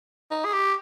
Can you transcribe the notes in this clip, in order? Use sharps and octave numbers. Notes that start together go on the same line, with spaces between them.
D#4
G#4
G4